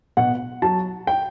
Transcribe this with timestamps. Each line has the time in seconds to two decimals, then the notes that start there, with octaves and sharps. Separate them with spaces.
0.17 B2 F#5
0.62 F#3 A5
1.07 G5